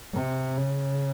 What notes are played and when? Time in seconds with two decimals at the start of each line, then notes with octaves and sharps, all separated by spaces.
0.14 C3
0.57 C#3